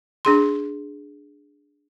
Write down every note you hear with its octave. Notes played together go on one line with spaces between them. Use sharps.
D4 G#4 C6